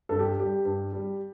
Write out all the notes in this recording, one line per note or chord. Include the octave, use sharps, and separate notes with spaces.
G2 A4
G4
G3 G4
G2
G3